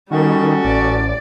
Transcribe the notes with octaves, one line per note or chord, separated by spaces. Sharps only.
D#3 G3 C#4 F#4 A4
A1 D5